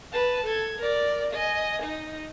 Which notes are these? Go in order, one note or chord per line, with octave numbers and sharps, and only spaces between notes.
B4 A5
A4 G#6
A#4 D5
D#5 G#5
D#4